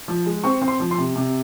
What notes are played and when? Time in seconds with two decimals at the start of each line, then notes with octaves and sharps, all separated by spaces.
0.08 F3
0.26 G#3
0.44 C4 C#6
0.62 C4
0.68 C6
0.80 F3
0.91 C6
0.98 C3
1.16 C3